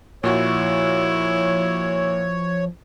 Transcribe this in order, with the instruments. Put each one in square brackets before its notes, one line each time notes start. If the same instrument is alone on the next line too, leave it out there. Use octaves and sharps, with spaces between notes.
[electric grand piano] A#2 F#4 [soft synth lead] F3 [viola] E4 [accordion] C#5